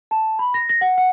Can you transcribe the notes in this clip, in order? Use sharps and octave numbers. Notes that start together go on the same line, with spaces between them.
A5
B5
A#6
A#6
F#5
F#5